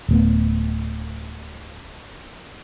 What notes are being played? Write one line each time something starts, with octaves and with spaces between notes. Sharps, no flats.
D1 A3 B3